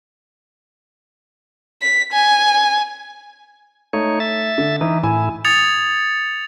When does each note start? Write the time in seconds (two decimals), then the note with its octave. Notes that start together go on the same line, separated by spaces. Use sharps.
1.82 B6
2.12 G#5
3.93 A3 D#4 C#5
4.20 E5 A6
4.58 D3
4.81 E3 D#4
5.04 A2 E4 G#5
5.45 D#6 G#6 A6 C#7 F7